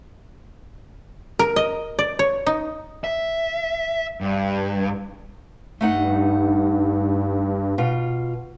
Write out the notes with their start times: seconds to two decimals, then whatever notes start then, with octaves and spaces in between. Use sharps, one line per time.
1.39 A#4
1.56 D#5
1.99 D5
2.19 C#5
2.46 D#4
3.04 E5
4.21 G2
5.81 G2 A3 D#4 F#5
7.78 B2 F4